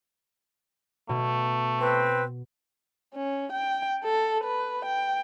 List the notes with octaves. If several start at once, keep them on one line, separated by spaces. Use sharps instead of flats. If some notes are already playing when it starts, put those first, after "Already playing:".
B2 A3
C4 B4
C#4
G5
A4
B4
G5